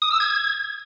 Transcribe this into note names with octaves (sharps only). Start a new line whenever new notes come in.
D#6
E6
G#6